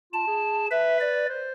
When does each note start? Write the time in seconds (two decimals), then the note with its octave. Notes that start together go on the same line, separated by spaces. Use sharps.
0.13 F4 A5
0.27 G#4
0.71 B4 E5
1.00 D5
1.29 C5